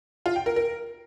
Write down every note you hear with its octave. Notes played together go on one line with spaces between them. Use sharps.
F4
G5
A#4
A#4